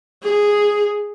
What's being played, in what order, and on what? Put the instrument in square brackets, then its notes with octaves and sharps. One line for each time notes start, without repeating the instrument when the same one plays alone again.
[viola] G#4